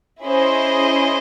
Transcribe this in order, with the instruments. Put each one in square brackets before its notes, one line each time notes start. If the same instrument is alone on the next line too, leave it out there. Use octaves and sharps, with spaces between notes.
[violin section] C#4 E4 G#4 C5 D#5